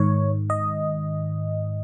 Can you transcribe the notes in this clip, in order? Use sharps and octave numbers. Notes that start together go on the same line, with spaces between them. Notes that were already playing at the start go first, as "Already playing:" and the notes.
Already playing: G#2 D#3 C#5
D#5